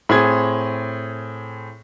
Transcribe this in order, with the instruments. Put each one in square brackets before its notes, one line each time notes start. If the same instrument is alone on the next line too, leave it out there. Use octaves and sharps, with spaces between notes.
[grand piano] A2 C4 G#4 G#6